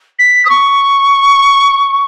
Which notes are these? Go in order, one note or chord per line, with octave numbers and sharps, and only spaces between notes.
B6
D#6
C#6